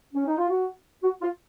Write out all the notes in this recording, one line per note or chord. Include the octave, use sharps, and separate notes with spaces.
C#4
D#4
F4
F#4
F#4
F4